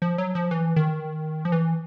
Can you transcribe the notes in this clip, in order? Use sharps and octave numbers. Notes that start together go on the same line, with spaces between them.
F3
F#3
F3
E3
D#3
F3
E3